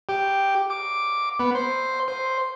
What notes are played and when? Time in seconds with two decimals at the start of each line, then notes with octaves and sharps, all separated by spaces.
0.09 G4
0.70 D6
1.40 B3
1.55 C5
2.08 C5